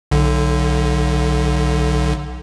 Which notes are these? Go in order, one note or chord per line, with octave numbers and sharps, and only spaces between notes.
B1 D3